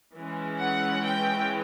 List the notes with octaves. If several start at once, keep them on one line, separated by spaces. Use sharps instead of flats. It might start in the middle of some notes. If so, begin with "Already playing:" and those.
E3 G#3 C#4
F#5
G5